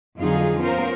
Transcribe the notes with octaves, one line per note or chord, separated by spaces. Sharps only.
F2 D3 F#3 D#4 F4 G#4
B3 C#4 F4 A#4 C5